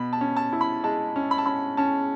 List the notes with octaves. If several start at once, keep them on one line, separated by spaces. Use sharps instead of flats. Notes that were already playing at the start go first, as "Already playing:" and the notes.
Already playing: B2 B5
A5
C#4
A5
E4
B5
G#3 A5
C#4
B5
A5
C#4 B5
C#4 A5